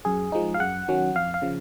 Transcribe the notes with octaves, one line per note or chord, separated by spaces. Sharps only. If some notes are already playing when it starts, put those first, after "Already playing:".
F#2 G#4
F3 G#3 D#4
F5
F#2 F#5
D#3 F#3 C#4
F2 F5
F5
C#3 F3